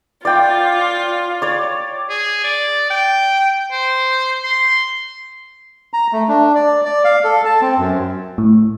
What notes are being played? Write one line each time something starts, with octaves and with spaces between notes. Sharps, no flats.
F4 D5 G5 D6
C#5 D5
G#4
D5
G5
C5
C6
A#5
A3
D4
D5
D5
F5
A4
A5
C4
F#2
A2